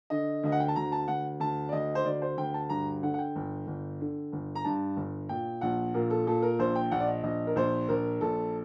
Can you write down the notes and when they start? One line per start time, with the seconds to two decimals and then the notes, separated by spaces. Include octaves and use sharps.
0.10 D3 D#5
0.43 D2 D#5
0.52 F#5
0.60 G5
0.68 A5
0.76 D2 A#5
0.92 A5
1.08 D2 F#5
1.40 D2 A5
1.69 D5
1.72 D2 D#5
1.95 C5
2.05 D2 D5
2.22 C5
2.37 D2 G5
2.54 A5
2.70 G2 A#5
3.02 D3 F#5
3.14 F#5
3.19 G5
3.36 G1
3.67 G1
4.00 D3
4.33 G1
4.55 A#5
4.64 G2 A5
4.97 G1
5.29 A#2 G5
5.61 A#1 F#5
5.94 A#2 A#4
6.11 A4
6.27 A#2 A4
6.42 A#4
6.59 A#1 C5
6.76 G5
6.91 A#1 F#5
7.00 D5
7.08 D#5
7.23 A#1 D#5
7.47 A#4
7.56 A#1 C5
7.89 A#1 A#4
8.21 A#1 A4